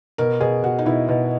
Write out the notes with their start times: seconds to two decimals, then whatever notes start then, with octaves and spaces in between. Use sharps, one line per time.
0.18 B2 A#4
0.41 B2 G#4
0.63 B2 F#4
0.79 D#4
0.86 B2 E4
1.09 B2